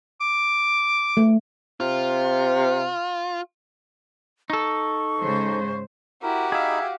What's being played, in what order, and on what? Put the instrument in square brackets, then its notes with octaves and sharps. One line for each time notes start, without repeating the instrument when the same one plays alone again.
[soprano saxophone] D6
[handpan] A3
[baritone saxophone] C3 [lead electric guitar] F4
[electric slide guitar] D#4 A4 [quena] C#6
[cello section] G#2 C#3 C5
[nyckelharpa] E4 [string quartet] F#4 G4 [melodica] A#4
[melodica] D#4 B5 [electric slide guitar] G#4 E5 [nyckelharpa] F5